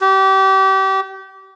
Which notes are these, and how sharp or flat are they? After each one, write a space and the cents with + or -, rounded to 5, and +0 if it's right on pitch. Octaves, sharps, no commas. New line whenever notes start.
G4 -30